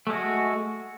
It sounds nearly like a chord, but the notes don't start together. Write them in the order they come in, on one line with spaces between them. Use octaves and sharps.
A3 G#3 F#4